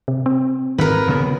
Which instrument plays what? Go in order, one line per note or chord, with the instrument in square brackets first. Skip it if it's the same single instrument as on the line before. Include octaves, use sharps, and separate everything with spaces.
[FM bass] C3
C4
[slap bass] G#1 [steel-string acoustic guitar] A#4 B4
[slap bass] D#1 C#3 B3